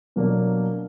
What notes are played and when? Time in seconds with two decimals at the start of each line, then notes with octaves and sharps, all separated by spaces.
0.16 B2 F#3 A#3 D4